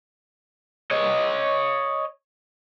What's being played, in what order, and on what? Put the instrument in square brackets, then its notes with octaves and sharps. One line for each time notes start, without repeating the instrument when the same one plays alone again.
[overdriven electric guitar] C#5 D#5